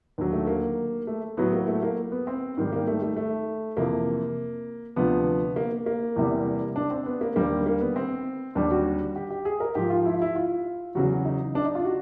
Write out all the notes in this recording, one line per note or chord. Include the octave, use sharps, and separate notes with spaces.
D#2 D3 F#3
A3
A#3
A3
A2 F#3 B3
A#3
A3
A#3
B3
C4
G#2 D#3 G3
A#3
A3
A3
A3
F2 C3 E3 A#3
D2 C3 F3 B3
A#3
A#3
E2 C3 E3 G3
D4
C4
B3
A#3
D#2 D3 G3 A#3
A#3
B3
C4
D#2 D3 G3 D4
F#4
G4
G4
G#4
A#4
G#2 F3 G4
F4
E4
F4
E4
F4
E2 C#3 F#3 F#4
D#4
D4
D#4
F4
F#4